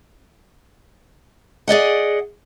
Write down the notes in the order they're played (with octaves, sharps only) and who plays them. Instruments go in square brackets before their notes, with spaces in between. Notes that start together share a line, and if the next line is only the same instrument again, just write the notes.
[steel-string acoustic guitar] G#4 D5 D#5 F#5